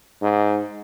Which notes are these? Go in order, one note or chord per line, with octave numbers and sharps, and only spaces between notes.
G#2